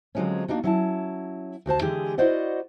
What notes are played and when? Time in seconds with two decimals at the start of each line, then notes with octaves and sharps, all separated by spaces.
0.15 D3 F3 F#3 G#3 C4 C#4
0.48 A#3 D4 D#4 F#4
0.64 F#3 C#4 E4 F5 A5
1.66 D2 F#4 C5 A5
1.82 D3 E3 G#3 G4 G#4
2.18 E4 F#4 C5 D5 D#5 F#5